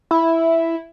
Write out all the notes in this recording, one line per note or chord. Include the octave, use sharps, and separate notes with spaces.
E4